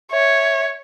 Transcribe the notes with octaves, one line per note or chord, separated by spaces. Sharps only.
C#5 E5